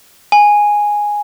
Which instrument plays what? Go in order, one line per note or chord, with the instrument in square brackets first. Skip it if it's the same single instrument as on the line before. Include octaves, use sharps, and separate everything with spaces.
[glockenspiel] G#5